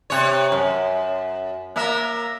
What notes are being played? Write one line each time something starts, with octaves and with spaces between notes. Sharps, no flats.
C3 C#5
F#2
A#3 A#4 E5